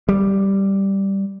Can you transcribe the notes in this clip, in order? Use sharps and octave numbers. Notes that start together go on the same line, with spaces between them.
G3